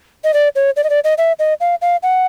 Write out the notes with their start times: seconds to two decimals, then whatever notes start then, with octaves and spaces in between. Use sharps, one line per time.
0.24 D#5
0.34 D5
0.55 C#5
0.76 D5
0.84 D#5
0.90 D5
1.04 D#5
1.18 E5
1.39 D#5
1.60 F5
1.82 F5
2.03 F#5